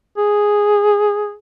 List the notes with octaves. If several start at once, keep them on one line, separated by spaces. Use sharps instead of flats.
G#4